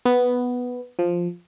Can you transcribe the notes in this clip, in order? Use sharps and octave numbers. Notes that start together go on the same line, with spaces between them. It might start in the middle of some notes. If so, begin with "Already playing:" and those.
B3
F3